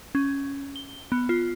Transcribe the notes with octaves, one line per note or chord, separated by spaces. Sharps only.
C#4
G7
B3
F4